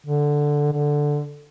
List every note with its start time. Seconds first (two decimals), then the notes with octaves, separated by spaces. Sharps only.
0.06 D3
0.72 D3